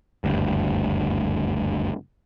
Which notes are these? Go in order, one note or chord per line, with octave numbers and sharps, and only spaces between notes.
F#1 D2 G2